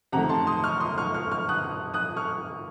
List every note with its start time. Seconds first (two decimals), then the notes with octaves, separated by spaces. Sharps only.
0.12 F2 C3 D#3 A3 F#5 A#5
0.29 A5 C6
0.47 C6 D#6
0.64 C#6 F6
0.80 C6 D#6
0.98 C#6 F6
1.14 C#6 F6
1.31 C#6 F6
1.49 D#6 F#6
1.94 D#6 F#6
2.16 C#6 F6